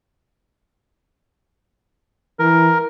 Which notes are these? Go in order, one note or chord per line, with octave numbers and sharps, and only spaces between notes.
E3 A#4